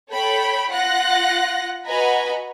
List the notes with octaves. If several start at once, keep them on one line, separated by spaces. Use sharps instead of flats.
A4 C#5 G5 B5
F4 F#5 F#6 A#6
F#4 B4 D#5 G#5 A#5 B5